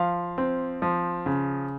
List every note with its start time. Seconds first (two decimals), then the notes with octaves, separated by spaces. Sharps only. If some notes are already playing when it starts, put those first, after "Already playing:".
Already playing: F3 F5
0.38 C4
0.82 F3
1.26 C#3